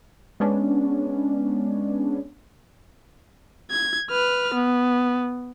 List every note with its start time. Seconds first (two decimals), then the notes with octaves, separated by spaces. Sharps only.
0.40 G#3 B3 C#4 D4
3.71 G#6
4.10 B4 F6
4.54 B3